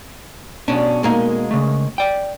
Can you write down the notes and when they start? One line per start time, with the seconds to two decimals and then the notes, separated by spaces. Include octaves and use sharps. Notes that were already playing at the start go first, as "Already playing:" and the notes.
0.68 B2 C#4 D4
1.03 G#3 A#3 D#4
1.51 C#3 A3
1.98 D5 G5